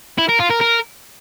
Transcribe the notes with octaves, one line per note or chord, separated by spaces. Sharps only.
E4
A#4
F4
A#4
A#4